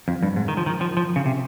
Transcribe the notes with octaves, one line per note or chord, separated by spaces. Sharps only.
F2
G2
G#2
D#3
F3
D#3
F3
F3
C#3
C3